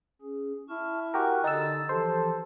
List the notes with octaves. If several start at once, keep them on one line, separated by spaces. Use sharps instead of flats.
C#4 G#4
E4 A5 C#6 F6
F#4 G4 A#4 G#5 C#6 F#6
D3 D#4 E6 A6
E3 F3 G4 A4 C5